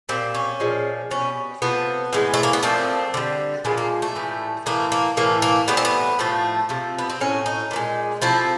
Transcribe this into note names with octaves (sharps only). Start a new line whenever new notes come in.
A#2 G3 C4
C#4
A#2 F3 G#3
B2 G3 C#4
C3 F3 A3 B3
A2 E3 G#3
A3
A#3
B3
A#2 F3 A3 C4
D3 G3
A#2 F3 G#3 B3
A#3
A3
A2 E3 G3
A2 E3 A3 A#3
A#3
A2 E3 A3 A#3
A#3
A2 E3 G3 B3
C4
B3
A2 F3 A3
C3 F3 A3
B3
C4
A2 F#3 A3 C#4
D#4
A#2 F3
G#3
C3 F3 A3 E4